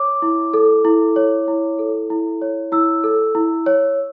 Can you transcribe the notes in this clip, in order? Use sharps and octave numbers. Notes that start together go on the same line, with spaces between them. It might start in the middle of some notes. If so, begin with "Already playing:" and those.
Already playing: C#5 D6
E4
A4
E4
C#5
E4
A4
E4
C#5
E4 E6
A4
E4
C#5